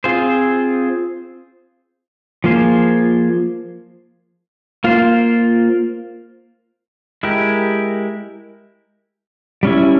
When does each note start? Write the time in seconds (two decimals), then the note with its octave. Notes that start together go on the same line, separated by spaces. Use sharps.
0.04 C4 F4 G#4 C5
2.44 F3 A#3 F4 G#4 C5
4.84 A#3 F4 C5
7.23 G#3 E4 G4 A#4
9.63 G3 C#4 E4